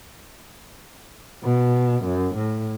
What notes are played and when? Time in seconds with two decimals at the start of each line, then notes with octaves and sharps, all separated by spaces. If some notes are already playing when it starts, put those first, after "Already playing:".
1.43 B2
2.04 F#2
2.35 A2